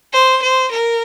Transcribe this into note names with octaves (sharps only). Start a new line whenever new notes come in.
C5
C5
A#4